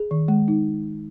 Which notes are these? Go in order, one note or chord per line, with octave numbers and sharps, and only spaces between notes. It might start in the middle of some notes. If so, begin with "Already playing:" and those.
Already playing: G#4
D#3
G#3
D#4